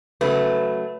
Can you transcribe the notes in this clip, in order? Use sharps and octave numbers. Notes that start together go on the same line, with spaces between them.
C#3 F#3 A3 B4